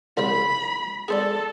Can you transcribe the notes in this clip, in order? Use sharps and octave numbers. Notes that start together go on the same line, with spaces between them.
C2 C#3 C5 B5
G#4 A4 C5 D5